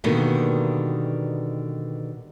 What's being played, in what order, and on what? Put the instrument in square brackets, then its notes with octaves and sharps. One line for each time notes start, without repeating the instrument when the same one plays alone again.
[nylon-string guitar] B2 D3 D#3 G3 A#3 B3